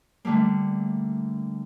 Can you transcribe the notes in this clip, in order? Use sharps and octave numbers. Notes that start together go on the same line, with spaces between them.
D3 G3 A3 A#3